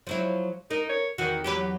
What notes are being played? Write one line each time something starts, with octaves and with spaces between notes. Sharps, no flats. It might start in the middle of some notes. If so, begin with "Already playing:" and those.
F3 F#3 E4
D#4 A#4
C#5
E2 D#3 F#4
E2 F#3 G4 B4